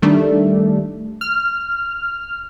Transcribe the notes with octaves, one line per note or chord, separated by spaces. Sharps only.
D#3 G3 A3 D4
F6